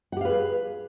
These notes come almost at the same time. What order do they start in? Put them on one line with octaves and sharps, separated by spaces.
F#5 G4 F5 B4 G#4